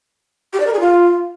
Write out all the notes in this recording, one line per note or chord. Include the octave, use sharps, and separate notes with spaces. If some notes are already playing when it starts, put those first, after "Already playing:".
G4
D5
A#4
G#4
F4